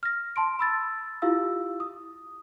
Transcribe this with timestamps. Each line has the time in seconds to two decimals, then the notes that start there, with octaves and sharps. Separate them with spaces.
0.03 F6 A#6
0.36 A5 C6 D7
0.59 B5 E6 A6
1.22 E4 F4 G4 F5 E6
1.80 D#6